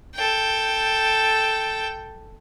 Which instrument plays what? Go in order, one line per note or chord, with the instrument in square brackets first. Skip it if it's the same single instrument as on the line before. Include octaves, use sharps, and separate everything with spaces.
[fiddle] A4 G5